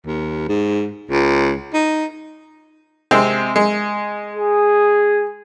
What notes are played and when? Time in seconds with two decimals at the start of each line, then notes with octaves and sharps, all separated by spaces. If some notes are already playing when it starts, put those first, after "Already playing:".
0.06 D#2
0.48 G#2
1.10 C#2
1.73 D#4
3.11 C3 G#3 C4
3.56 G#3
4.36 G#4